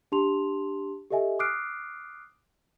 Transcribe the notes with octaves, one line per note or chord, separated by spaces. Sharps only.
D4 G4 A5 C6 F7
G4 A4 D#5 E5 G#5
D6 D#6 F6 F#6 C7 D7